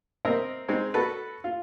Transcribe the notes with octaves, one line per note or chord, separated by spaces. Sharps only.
C4 A#4 D#5 E5
G#3 C4 D#4
F#4 A4 B4
F4